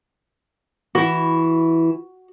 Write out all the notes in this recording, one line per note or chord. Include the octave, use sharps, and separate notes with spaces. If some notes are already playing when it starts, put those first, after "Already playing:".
E3 E4 F#4